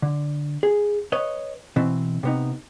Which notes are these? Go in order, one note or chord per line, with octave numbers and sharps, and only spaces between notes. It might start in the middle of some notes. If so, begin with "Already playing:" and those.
D3
G#4
B4 C#5 D#5
B2 E3 C4
C3 B3 D#4